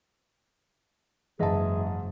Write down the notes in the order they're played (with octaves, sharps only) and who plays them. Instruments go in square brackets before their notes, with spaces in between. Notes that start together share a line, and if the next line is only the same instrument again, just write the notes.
[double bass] F#1 [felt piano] G#2 A5 [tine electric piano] E3 D#5 E5 [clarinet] G#4